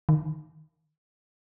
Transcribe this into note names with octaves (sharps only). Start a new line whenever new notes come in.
D#3